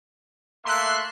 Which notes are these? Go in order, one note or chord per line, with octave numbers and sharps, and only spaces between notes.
A3 A#3 E5 C6 F#6